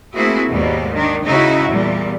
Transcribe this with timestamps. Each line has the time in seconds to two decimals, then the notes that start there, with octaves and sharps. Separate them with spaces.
0.15 A3 A#3 C4 E4 F#4 G#4
0.51 D#2 G#2 B2 G3
0.92 D#3 D4
1.24 C#3 D#4 E4 F#4
1.68 E2 A#2 G3